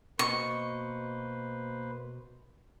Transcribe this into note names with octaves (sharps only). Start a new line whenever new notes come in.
B2 A#3 B4 C5 D#5 C#6